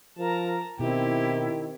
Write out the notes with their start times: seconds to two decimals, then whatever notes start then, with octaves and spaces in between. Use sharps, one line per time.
0.19 F3 A#4 A5 A#5
0.79 B2 D#3 C4 E4 G4